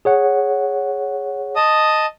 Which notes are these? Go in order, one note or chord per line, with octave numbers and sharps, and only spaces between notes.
G#4 C#5 F#5
D#5 A5 D#6